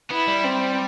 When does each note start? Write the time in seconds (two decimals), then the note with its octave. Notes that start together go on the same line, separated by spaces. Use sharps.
0.10 B3 E4
0.27 G3
0.44 C4